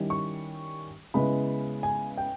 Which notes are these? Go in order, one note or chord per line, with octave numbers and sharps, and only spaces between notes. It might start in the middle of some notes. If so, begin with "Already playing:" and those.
Already playing: D#3 G3 C#4 E4
C#6
C#3 G#3 B3 E4 B5
G#5
G5